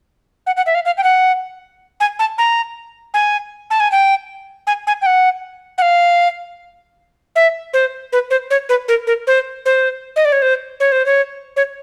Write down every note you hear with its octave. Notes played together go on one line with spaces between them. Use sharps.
F#5
F#5
E5
F5
F5
G5
F#5
G#5
A5
A#5
G#5
A5
G#5
G5
G#5
G#5
G5
F#5
F#5
F5
E5
C5
B4
C5
C#5
B4
A#4
A#4
C5
C5
D#5
D5
C#5
C5
C#5
C5
C#5
C#5